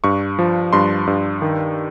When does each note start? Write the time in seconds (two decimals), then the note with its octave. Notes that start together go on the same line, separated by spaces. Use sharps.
0.04 G2 C#6
0.39 F3
0.73 G2 C6
1.07 G2
1.42 D#3